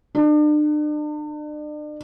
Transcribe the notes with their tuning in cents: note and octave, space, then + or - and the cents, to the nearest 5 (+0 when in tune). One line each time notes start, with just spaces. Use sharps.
D4 +40